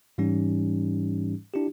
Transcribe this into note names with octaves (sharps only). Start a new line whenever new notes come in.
G#2 E3 G3 C#4 D#4 G4
D4 E4 F4 G4